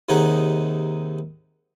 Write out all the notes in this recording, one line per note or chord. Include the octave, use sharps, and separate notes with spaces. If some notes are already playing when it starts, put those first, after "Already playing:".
D#2 C3 D#3 D#4 G#4 F#5